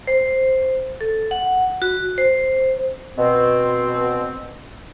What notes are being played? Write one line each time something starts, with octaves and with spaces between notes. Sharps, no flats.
C5
A4
F#5
F#4
C5
B2 C4